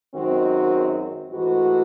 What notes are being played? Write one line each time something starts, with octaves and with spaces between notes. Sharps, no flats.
F#2 D#3 G#3 C4 F#4
G#2 E3 A3 F#4